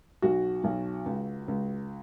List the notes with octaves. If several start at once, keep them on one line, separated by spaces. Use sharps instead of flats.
B1 F#4
B1
C#2
C#2